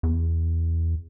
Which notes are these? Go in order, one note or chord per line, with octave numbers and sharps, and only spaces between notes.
E2